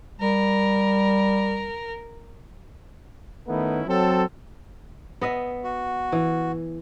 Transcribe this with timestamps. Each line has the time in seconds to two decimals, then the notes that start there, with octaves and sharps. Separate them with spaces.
0.21 G3 A#4
3.48 D#3 A3 B3 C#4 D#4 E4
3.87 F#3 C4 A4
5.21 B3 D#5 E5
5.64 F#4
6.12 E3